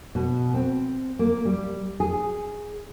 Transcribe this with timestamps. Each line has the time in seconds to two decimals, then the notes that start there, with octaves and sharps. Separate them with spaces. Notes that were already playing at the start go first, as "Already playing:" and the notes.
0.15 B2
0.54 C4
1.19 A#3
1.45 G3
2.00 G#4